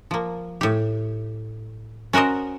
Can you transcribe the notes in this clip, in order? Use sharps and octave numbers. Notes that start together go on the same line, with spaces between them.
F3 A#3
A2 G4
C#4 F#4 A#4 C5 D#5